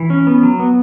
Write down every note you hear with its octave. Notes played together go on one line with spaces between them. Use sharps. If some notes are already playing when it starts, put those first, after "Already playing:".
Already playing: E3
C#4
B3
F#3
B3